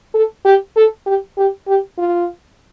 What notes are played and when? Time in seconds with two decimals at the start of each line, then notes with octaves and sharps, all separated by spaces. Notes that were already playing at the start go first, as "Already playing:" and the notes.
0.14 A4
0.45 G4
0.76 A4
1.06 G4
1.37 G4
1.67 G4
1.98 F4